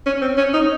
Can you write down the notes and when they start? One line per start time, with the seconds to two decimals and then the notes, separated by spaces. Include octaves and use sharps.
0.06 C#4
0.22 C4
0.38 C#4
0.53 D#4